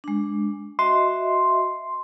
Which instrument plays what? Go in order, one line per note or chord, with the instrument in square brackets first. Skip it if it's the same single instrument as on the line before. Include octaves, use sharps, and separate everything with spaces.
[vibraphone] G#3 D4
[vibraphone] F#4 D#5 E5 [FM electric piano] C6